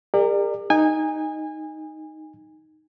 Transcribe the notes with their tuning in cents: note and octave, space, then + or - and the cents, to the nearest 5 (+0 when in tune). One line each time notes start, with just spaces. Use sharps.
G4 +45 A#4 -20 D5 +25
D#4 +0 G#5 -25